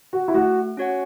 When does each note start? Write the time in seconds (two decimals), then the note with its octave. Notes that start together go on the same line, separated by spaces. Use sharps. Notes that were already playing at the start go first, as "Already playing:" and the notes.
0.13 F#4
0.28 E4
0.34 A3 F#4
0.77 C#4 F#4 C#5 F#5